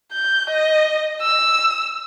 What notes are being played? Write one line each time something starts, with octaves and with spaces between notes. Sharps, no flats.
G6
D#5
E6